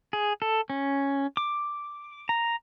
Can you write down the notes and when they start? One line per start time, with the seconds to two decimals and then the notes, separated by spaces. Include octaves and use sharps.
0.13 G#4
0.42 A4
0.70 C#4
1.37 D6
2.29 A#5